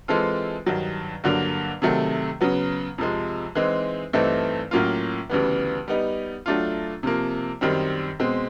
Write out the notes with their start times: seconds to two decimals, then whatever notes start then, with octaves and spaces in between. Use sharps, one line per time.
0.08 E3 G#3 C4 F4 A4
0.66 G2 D#3 F#3
1.24 G2 D3 F#3 A#3
1.82 C3 D#3 F#3 A3
2.41 C#3 F#3 B3
2.98 F2 C3 F3 G#3
3.55 E3 G#3 C4 D#4
4.13 G2 E3 A3 C4 D#4
4.71 A2 F#3 A#3 C#4 F4
5.30 D2 C#3 E3 G3 B3
5.88 G3 B3 D#4
6.46 F#3 A3 D4 F4
7.03 C3 F3 A#3
7.61 F#2 D#3 G3 C4
8.20 B2 G#3 C4